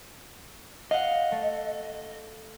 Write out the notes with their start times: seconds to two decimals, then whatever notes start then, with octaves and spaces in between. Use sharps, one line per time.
0.91 D#5 F5 F#5
1.32 A3